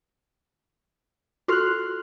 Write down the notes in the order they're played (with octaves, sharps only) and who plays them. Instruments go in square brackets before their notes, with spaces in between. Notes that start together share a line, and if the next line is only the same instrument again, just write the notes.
[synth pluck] F4 F#4 A4 [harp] C6 F6 F#6